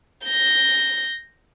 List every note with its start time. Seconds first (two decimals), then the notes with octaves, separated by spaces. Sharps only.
0.25 G6 A#6